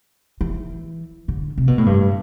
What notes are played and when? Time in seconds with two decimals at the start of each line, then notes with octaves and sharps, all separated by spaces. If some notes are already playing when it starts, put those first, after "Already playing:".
0.41 E3
1.28 D3
1.58 C3
1.68 B2
1.78 A2
1.86 G2